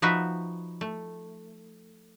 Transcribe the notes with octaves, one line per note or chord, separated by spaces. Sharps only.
F3 D#4 F#4 B4 E5
A3